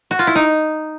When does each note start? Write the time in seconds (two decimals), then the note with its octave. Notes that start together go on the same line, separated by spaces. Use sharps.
0.11 F#4
0.19 F4
0.27 E4
0.35 D#4